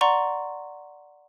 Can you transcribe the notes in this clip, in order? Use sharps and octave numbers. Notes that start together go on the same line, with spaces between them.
D5 F#5 A#5 C6 C#6